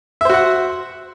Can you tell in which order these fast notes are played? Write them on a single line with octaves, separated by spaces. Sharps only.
E5 C5 F#4 F#5